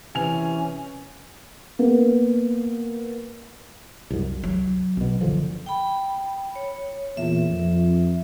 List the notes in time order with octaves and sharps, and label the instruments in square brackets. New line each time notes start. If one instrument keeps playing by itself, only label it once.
[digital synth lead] C3 [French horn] E3 [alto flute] C#4 [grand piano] G#5 F7
[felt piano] A#3 B3
[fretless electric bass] C2 F#2
[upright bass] F#3
[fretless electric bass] B1 B2
F#1 D3 F3
[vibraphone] G5 B5
C#5
[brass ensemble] E2 A#2 [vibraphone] E5
[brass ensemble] F2